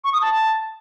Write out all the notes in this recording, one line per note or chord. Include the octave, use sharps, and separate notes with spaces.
C#6
D#6
A5